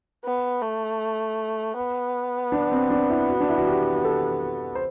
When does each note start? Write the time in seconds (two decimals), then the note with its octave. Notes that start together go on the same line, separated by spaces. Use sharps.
0.24 B3
0.62 A3
1.77 B3
2.52 D4
2.72 C4
2.90 D4
3.10 E4
3.29 F#4
3.41 D4
3.49 E4
3.58 F#4
3.67 G4
3.96 G4
4.05 A4
4.75 C5